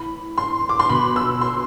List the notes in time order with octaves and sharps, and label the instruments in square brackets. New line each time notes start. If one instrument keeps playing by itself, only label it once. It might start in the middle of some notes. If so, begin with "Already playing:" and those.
Already playing: [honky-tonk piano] A2 E3 B5
C6
D6
C6
B2 B5
E6
C6